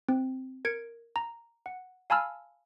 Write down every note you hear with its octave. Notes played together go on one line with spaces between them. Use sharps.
C4
A#4 G#6 C#7 D7
A#5
F#5
F5 G#5 A5 B5 E6 F6